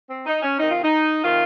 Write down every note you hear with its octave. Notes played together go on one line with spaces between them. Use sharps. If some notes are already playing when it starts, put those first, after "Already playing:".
C4
D#4
C#4
C3 D#3 D#4
F4
D#4
C3 D#3 F4